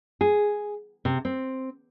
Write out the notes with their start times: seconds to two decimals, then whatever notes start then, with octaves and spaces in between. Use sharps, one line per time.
0.21 G#4
1.05 C3
1.25 C4